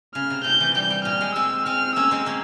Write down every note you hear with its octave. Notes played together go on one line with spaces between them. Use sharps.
C#3 F6
C3
C3 G6
E3
G3 G6
G3
A#2 F6
G#3
G#3 C4 E6
G#3 C4 F6
A#3 C#4 E6
G#3 C4
A#3 C#4